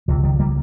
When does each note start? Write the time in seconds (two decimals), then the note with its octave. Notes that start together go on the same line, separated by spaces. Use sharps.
0.08 C#2 C3 F3
0.23 D#3 G3
0.40 G3 A#3